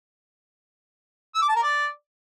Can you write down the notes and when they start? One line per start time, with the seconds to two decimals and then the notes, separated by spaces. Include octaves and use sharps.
1.35 E6
1.42 D6
1.49 A5
1.56 A#4
1.63 D5